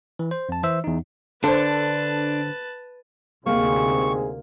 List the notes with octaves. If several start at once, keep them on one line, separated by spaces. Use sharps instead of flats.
E3
C5
F2 A5
E3 C5 E5 E6
E2 D#4
D3 D4 A4 B4 C5 A5
D2 G#2 C3 A#3 C4 G#4 C#6